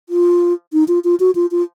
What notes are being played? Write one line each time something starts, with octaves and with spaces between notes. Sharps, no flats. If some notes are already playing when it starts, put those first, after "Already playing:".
F4
D#4
F4
F4
F#4
F4
F4